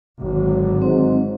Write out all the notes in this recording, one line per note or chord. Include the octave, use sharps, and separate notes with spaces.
G#1 D3 F#3
G#2 C4